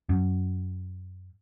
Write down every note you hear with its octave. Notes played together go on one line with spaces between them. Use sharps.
F#2